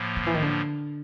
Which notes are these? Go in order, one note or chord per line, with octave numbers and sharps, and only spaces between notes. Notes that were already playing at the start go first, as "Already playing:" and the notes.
Already playing: A2 F3 A#3
D#3
E3
D#3
D3